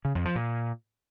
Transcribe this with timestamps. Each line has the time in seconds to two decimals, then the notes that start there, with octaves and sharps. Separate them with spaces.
0.05 C#3
0.15 F2
0.25 F3
0.36 A#2